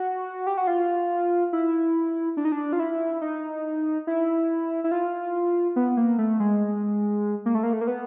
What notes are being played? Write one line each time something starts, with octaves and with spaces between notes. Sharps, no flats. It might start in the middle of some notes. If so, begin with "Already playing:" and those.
Already playing: F#4
G4
F#4
F4
E4
D4
D#4
D4
F4
E4
D#4
E4
E4
F4
B3
A#3
A3
G#3
A#3
A3
A#3
A3
A#3
B3